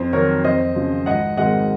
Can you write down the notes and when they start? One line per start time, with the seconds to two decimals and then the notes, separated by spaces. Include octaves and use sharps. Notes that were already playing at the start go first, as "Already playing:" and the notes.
Already playing: F2 C5
0.13 D#3 F#3 C4 A#4 C#5
0.44 F2 C5 D#5
0.75 C#3 F3
1.06 G#1 D#5 F#5
1.37 G#2 D#3 G#3 C4 D#5 F#5